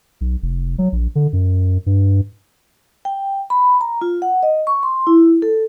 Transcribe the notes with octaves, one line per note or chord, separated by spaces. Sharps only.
B1
F1
F#3
A#1
D3
F#2
G2
G5
B5
A#5
F4
F#5
D#5
C#6
C6
E4
A4